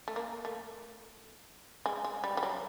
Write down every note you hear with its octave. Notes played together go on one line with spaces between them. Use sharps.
A3
A#3
A3
G#3
G#3
G3
G3
F#3